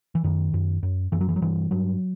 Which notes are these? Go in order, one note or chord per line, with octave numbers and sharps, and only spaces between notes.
E3
F#2 D#3
F#2
F#2
F#2 E3
F#3
E3
F#3
G2 E3
G2 F#3